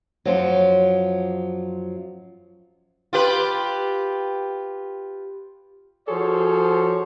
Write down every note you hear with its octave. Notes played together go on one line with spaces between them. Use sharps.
F#2 F3 F#3
F4 G4 B4
F3 F#4 G#4 A4 C5 C#5